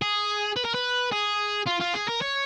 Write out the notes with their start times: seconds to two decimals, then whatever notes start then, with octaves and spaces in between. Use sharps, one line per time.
0.02 G#4
0.57 B4
0.65 A#4
0.74 B4
1.12 G#4
1.66 F4
1.80 F4
1.94 G#4
2.08 A#4
2.21 C#5